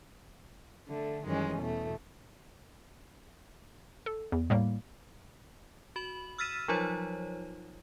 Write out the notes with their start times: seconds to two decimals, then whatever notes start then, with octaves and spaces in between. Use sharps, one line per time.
0.88 D3 A3
1.26 F#2 D#3 E3 G3 G#3 C#4
1.57 E2 B2 A3
4.06 A4
4.32 E2
4.50 A2 G3 A#3
5.96 F#4 B5 F#7
6.38 E6 F6 A6 B6 D#7 E7
6.68 F3 F#3 D#4 F4 C5 C#5